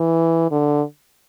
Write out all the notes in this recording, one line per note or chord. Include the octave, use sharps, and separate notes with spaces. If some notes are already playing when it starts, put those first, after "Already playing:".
Already playing: E3
D3